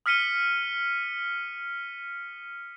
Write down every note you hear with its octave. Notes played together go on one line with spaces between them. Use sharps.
D#6 F6 B6 C#7 D#7 G7